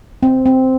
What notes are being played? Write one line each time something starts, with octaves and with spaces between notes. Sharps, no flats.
C4
C4